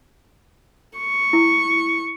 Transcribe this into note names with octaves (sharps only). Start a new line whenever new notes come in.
C#6
E4